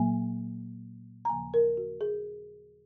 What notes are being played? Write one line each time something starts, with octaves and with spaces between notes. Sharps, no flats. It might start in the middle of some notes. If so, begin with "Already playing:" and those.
Already playing: A#2 F#3 A#3 G#5
A#5
D#2 C#3 F3 A#3 G#5
A#4
F#4
G#4